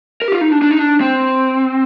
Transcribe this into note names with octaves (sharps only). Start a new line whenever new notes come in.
A#4
G4
F4
D#4
D4
D4
D#4
D4
C4